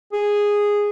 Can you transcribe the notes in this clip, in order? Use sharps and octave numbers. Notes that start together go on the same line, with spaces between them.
G#4